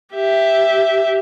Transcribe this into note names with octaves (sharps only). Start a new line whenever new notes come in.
G4 E5